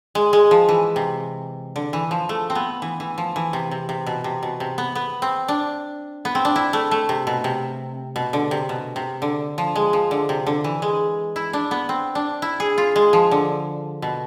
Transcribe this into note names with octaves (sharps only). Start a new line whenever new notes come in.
G#3
G#3
F3
E3
C3
D3
E3
F3
A3
C4
B3
E3
E3
F3
E3
C3
C3
C3
B2
C3
B2
C3
B3
B3
C4
D4
B3
C4
D4
E4
A3
A3
C3
B2
C3
B2
D3
C3
B2
C3
D3
F3
G#3
F3
D3
C3
D3
E3
G#3
E4
D4
B3
C4
D4
E4
G#4
F4
G#3
F3
D3
B2